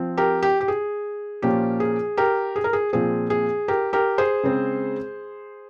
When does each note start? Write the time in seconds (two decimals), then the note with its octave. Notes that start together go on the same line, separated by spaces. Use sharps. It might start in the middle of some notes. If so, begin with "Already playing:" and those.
Already playing: F3 C4
0.17 G4 A#4
0.43 G4
0.60 G4
0.68 G#4
1.42 A#2 F3 A#3 C#4 G4
1.80 G#4
2.17 G4 A#4
2.56 G#4
2.64 A#4
2.73 G#4
2.93 A#2 F3 C4 G#4
3.30 G#4
3.68 G4 A#4
3.93 G4 A#4
4.18 G#4 C5
4.43 C#3 G#3 C4